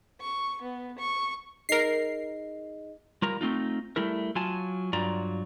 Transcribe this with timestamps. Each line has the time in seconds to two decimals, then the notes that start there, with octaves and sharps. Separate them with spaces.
0.21 C#6
0.62 B3
0.98 C#6
1.69 D#4 G#4 A#4 D#5 C7
3.22 G3 F4 A#4 A#5
3.41 A3 C4 D#4 F4
3.96 G3 A3 E4 A#4
4.35 F#3 F4 G#5 A5
4.93 G2 F#3 F4 D5 A#5